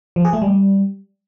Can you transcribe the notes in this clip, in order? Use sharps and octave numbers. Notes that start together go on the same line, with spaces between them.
F3
G#4
A3
G3